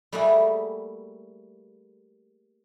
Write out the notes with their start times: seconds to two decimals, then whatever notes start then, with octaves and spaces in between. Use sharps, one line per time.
0.12 G3 A3 A#3 E4 F#4 G#4